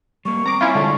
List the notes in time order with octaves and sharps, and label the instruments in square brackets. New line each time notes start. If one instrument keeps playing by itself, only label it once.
[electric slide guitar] G3 A#3 [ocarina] C#6
[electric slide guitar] C4 [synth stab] A#5 D6
[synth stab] C#4 E4 F4
[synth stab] D3 [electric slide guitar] G3 G#3 F4